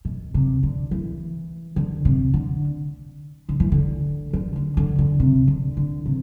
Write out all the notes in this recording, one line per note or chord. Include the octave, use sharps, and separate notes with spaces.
B2
C3
D3
E3
D3
C3
D3
D3
E3
D3
D3
D3
D3
D3
C3
D3
D3
C3